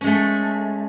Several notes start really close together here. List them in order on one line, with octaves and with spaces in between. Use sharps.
C#4 G#3 A3